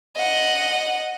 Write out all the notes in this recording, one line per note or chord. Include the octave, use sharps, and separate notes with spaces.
D#5 F#5